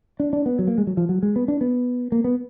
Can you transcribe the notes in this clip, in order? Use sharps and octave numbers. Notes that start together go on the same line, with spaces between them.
D4
D4
B3
F#3
A#3
G#3
F#3
F3
F#3
G#3
B3
D4
B3
A#3
B3